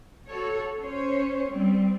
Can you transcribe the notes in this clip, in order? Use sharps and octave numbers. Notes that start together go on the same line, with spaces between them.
F#4 A4 C#5
C#4 C5 C#5
G3 C4